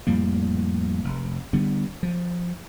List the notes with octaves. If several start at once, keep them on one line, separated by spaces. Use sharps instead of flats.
F2 A2 G3 A#3
F1
D3 G3 B3
F3